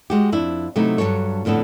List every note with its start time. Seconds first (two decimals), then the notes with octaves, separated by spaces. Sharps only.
0.10 G#3 F#4 G4
0.32 F2 D4 E4
0.76 C3 F#3 A3 B3 D#4 E4
0.98 G2 C3 F#3 A4 C#5
1.45 F2 A2 D3 B3 A4